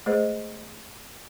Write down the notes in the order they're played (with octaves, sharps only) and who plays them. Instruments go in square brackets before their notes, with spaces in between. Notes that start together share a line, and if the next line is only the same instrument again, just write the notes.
[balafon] G#3 A3 G#4 B4 C5 D#5